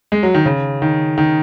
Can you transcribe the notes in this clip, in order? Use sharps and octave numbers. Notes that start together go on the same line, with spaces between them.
G#3
F#3
D#3
C#3
D#3
D#3